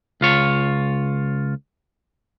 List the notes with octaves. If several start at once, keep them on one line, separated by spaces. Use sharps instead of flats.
C#2 F4 C#5